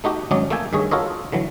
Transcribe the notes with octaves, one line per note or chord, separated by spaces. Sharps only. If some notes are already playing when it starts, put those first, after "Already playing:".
A3 D#4 F#4 G4
G#1 F#3 C#4 D#4 D5
A3 A#3 A4 G5 G#5
G2 D#3 G#4 C#5
F4 F#4 A4 A#4 C#5 D#5
D3 E3 F#3